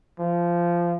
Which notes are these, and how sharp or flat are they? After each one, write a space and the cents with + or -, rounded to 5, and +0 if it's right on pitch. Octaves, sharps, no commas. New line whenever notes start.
F3 -15